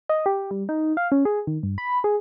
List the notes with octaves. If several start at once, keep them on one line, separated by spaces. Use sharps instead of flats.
D#5
G4
G3
D#4
F5
C#4
G#4
D#3
G2
B5
G#4